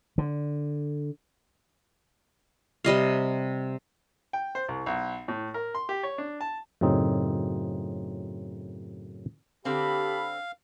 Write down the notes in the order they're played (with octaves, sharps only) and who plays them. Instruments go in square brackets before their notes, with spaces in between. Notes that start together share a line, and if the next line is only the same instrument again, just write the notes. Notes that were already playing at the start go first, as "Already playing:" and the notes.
[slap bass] D3
[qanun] C3 G3 D#5 F5
[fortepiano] G5
C5
C2
B1
A2
A#4
C6
G4
C#5
D4
A5
[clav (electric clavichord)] F#2 A2 C#3 C4 D#4
[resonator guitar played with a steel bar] D3 C4 [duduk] G4 [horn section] A4 A5 B5 [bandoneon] F5